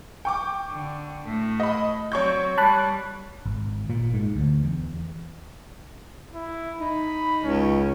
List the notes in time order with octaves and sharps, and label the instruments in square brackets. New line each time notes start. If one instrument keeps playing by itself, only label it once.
[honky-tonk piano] G5 C#6 D6
[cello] D3
A2 A3
[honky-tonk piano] D#5 B5
[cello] F#3 C4 [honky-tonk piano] C#5 C#6 G6
[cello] G3 [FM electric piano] A5 B5 F#6
[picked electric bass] G#1
A#2
G#2
D2
E2
[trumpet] E4
[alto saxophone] D#4 [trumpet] B5
[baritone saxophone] C#2 [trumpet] C#4